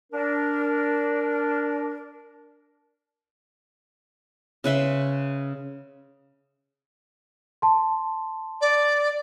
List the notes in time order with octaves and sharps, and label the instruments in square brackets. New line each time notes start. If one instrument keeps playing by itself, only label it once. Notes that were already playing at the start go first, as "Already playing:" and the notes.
[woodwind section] D4 A#4
[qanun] C#3 B4 E5 C6
[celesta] A5 C6
[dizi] D5